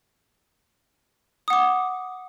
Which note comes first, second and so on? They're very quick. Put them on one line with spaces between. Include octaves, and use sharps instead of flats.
D#6 F#5 D6